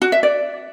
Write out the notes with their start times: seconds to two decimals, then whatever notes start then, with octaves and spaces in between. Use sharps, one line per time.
0.02 F#4
0.12 E5
0.23 D5